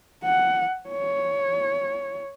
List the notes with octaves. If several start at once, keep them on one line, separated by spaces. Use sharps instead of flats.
F#5
C#5